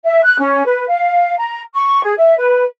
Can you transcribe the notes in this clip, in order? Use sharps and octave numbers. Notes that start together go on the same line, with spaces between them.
E5
F#6
C#4
B4
F5
A#5
C#6
G#4
E5
B4